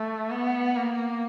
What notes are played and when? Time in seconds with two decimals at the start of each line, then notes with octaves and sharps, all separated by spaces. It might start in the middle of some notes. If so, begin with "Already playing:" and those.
Already playing: A3
0.31 B3
0.76 A#3